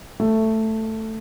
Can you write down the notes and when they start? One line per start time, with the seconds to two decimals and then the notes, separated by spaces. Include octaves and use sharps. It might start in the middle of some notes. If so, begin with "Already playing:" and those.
0.20 A3